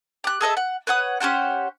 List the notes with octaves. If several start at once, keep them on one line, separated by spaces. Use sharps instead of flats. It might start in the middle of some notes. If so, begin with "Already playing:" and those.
G4 F#6
G#4 A4 D#5 E5
F#5
B4 C#5 F#5 D#6
C#4 G4 C5 F#5